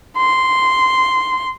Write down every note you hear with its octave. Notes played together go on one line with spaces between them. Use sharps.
C6